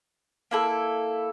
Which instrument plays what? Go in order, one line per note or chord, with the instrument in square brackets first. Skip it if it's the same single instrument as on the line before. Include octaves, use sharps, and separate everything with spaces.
[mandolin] A#3 E4 A4